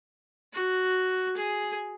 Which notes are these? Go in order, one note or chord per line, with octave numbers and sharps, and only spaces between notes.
F#4
G#4